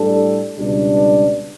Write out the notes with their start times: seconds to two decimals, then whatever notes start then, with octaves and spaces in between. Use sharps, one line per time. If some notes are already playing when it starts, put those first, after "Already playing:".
Already playing: A2 G3 D4 A4
0.58 C#2 B2 G3 D4